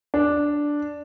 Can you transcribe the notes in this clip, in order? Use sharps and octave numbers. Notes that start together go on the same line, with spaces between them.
D4